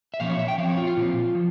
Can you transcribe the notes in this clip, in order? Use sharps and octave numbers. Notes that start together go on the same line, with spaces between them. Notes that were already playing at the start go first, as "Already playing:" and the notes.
E5
A#2 F3 C#4 F5
C#5
E5
G5
F3 C4 F5
C#5
F4
F4
A#2 F3 C4
F3